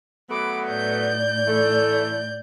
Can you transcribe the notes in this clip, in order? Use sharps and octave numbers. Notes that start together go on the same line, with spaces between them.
F#3 A3 B3 B5 D6
A2 D5 G6
E3 A3